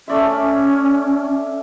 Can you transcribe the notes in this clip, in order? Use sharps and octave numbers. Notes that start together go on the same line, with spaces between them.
A3 C#4 D5 E5